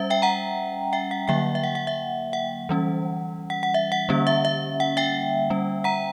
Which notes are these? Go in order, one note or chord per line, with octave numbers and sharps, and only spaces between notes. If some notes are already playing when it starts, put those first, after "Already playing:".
Already playing: G3 C#4 E5
E5 G5
F#5 A#5
E5 G5
F#5
D3 F#3 A#3 E5 G5
E5
F#5
F#5
E5
F#5
E3 G3 C#4
F#5
F#5
E5
F#5
D3 G3 A#3 C#4
E5
E5
F#5
E5 G5
G3 C#4
F#5 A#5